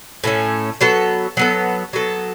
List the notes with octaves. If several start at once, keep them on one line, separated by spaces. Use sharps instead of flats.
A2 A3 C#4
F#3 B3 A4
F#3 B3 A4
F#3 B3 A4